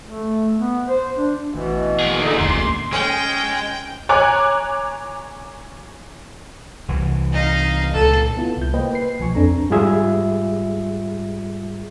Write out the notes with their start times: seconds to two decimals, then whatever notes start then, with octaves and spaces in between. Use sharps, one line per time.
0.05 A3
0.58 B3
0.88 C5
1.17 D4
1.54 A1 B2 E3
1.99 A#3 G#4
2.20 D3 D#4
2.38 E1 A1 D2 C6
2.93 G#3 C#4 G5
4.09 C#5 G#5 A#5 D6 F#6 G#6
6.88 C2 E3
7.33 D#4 F5
7.93 C#2 A#2 A4
8.37 B3 E4 F4
8.57 C2 G6
8.74 A#3 B4 C5 D#5 G5
8.93 B4 C7
9.20 B1 F3 G#5 C#6
9.35 F2 C4 D4 A4 A#5
9.70 G#2 G3 F4 G#4 E5